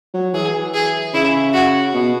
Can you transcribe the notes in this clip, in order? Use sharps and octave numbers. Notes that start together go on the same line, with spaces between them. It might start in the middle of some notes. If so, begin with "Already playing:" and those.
F#3
E3 G#4
G#4
C#3 E4
F#4
B2